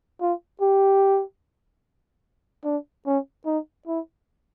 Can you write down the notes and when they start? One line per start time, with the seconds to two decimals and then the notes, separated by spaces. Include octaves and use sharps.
0.21 F4
0.62 G4
2.65 D4
3.06 C#4
3.46 D#4
3.87 E4